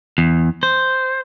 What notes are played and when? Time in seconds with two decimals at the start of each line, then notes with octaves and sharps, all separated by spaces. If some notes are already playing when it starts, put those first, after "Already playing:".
0.18 E2
0.63 C5